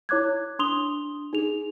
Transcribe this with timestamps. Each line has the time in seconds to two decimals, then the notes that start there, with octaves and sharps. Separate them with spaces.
0.09 E4 C#5 D6 F#6 G#6
0.59 D4 C6 D#6 F7 G7
1.33 D#4 G#4 F7